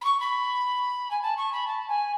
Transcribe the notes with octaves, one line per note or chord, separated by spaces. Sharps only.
B5
C#6
B5
G#5
A5
C#6
B5
A5
G#5